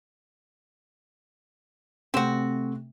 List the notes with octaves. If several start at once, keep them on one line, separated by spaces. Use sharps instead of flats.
C3 A3 C4 F#4